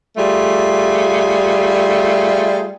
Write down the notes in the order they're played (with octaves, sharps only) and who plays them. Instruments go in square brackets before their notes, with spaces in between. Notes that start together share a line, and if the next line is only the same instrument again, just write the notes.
[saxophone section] G3 A3 F4 G#4